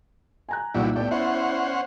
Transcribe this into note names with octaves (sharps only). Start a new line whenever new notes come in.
G#5 A#5 F#6
C2 A#2 E3 F#3 G3 D#4
A2 B3 G4 D5
C#4 E4 C5 F#5